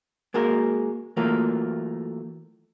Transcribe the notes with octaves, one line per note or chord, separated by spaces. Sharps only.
G#3 A#3 F#4 A#4
E3 F#3 A3 A#3 F4